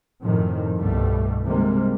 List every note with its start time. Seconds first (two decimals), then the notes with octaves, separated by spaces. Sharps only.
0.23 F#2 A2 C3 D#3 F3
0.78 C2 G2 B2 G3 A3
1.43 C3 D#3 G3 G#3 A#3